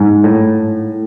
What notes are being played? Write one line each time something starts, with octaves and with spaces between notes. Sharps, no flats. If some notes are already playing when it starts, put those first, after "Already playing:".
Already playing: G#2
A2